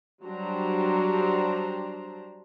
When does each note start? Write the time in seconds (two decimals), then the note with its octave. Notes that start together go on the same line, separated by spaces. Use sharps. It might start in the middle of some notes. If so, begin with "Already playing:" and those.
0.24 F#3 G3 D4 G4 C5 A#5